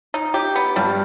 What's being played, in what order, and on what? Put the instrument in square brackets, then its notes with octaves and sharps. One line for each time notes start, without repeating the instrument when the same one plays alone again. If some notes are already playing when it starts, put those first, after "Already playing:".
[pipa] D#4
G4
B3
[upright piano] G2 [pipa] G3